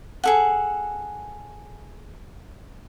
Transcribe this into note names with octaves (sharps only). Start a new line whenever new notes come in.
G#4 A4 F#5